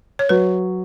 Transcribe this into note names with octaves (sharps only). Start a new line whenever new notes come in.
C#5
F#3 B4